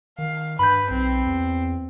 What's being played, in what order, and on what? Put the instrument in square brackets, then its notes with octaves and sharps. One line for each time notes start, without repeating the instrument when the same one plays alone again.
[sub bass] D#3 [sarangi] F5
[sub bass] G2 [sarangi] B4 [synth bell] B5 G6
[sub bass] B1 [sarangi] C4
[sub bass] E2